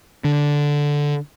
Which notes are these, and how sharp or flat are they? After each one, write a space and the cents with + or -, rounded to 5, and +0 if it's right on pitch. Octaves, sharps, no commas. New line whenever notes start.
D3 -5